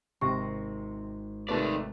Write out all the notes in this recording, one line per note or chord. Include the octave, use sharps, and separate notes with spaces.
G#1 C3 C#6 A#6 D7
C3 D#3 A3 B4 D5